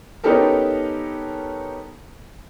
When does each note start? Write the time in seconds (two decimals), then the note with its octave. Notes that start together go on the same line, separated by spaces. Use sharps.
0.24 B3 C#4 D#4 G4 A4 A#4